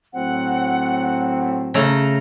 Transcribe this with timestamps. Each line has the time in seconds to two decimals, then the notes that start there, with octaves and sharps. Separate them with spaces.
0.13 A2 F#3 C4 F#5
1.74 C#3 A3 A#5